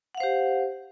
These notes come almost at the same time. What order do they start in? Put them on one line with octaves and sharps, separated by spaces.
F#5 F5 C5 G4